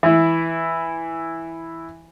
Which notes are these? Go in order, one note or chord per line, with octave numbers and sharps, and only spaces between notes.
E3 E4